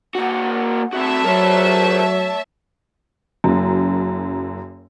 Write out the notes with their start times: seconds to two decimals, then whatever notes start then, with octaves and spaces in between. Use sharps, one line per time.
0.15 A#3 F#4 F#5
0.93 A3 C4 F#4 E5 A5
1.24 F#3 A#4 C5 C#5
3.44 F#1 F#2